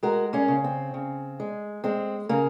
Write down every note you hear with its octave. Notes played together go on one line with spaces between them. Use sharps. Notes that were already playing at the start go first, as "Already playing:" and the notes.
G#3 F#4 A#4
A#3 C#4
C#3
C4
C#3
G#3
G#3 C4
C#3 A#3